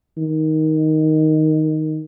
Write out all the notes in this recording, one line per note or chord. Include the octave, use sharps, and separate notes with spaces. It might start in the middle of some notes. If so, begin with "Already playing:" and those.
D#3